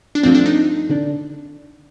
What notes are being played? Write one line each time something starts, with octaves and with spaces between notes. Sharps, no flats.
D4
G2 F3 A3 C4
D4
D#4
D3 G3 D4